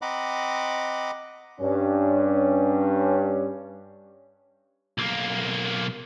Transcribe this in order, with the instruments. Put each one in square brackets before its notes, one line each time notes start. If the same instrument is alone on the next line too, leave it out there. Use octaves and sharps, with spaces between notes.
[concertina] C4 D#5 F#5 A#5 B5 D6
[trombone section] G2 C#4
[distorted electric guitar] B1 A#3